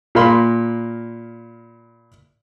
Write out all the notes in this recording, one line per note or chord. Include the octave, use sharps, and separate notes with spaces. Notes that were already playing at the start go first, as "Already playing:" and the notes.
A#2 A#4 F5 B5 C6